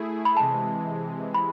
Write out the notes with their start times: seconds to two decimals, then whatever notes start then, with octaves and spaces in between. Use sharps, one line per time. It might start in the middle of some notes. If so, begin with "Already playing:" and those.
Already playing: A3 E4 G#4
0.25 B5
0.37 C3 E3 G#3 A5
1.34 B5